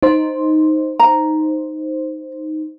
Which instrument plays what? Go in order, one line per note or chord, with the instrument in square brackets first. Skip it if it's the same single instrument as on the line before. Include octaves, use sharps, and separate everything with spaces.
[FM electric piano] D#4 C5
[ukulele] A#5